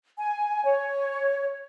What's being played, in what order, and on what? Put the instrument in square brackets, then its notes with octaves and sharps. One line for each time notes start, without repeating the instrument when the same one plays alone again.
[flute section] G#5
C#5